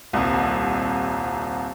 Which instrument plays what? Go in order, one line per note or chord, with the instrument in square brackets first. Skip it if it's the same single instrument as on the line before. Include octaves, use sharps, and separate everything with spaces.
[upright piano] D#1 C2